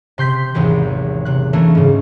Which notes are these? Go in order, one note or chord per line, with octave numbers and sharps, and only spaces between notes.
C3 C6 G6 B6
G#1 E2 C3 E3 F#3
C3 F#6
E3 A3 A#3 C#4 D4
G#2 C#3